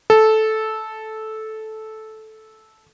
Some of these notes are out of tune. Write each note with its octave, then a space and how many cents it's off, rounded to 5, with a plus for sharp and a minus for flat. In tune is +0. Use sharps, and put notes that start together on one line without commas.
A4 -10